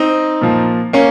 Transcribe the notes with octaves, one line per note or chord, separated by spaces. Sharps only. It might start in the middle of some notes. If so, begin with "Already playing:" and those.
Already playing: C4 D#4
A#2 F3
A#3 C#4